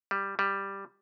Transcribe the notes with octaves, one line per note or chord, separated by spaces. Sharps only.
G3
G3